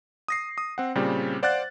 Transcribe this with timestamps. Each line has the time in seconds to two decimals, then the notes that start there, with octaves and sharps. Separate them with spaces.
0.28 D#6 A#6 C7
0.58 D#6
0.78 C4 F#5
0.95 A#2 C#3 G3 C4
1.43 C5 D5 F5 F#5 F#6 A6